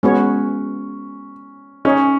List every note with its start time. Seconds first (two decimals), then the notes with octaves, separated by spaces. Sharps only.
0.03 G#3 B3 C#4 F#4 C#5
1.85 C#4 D#4 G#4 C#5